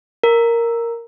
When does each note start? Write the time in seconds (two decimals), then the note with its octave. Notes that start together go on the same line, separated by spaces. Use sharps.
0.23 A#4